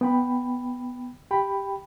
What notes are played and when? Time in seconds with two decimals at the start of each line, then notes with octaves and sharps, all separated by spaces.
0.01 B3 G5 B5
1.31 G4 G5 B5